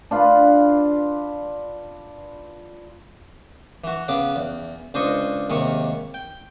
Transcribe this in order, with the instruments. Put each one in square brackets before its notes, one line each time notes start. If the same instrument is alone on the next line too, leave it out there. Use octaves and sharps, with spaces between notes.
[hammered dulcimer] D4 F4 B4
[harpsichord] E3 F#4
C#3 B3 D6
E2
C#2 D4 C5 D#5 C#6 D#6
D#2 C3 D#3 G#3 C#6
G5